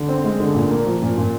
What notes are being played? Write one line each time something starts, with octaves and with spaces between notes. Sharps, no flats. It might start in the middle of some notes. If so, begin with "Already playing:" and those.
Already playing: D3
C4
G#3
D3
A#2
A#3
F3
A#2
A#2